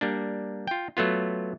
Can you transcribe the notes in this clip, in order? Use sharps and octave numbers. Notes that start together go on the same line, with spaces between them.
G3 A#3 D4
F4 G5
F#3 A3 B3 F4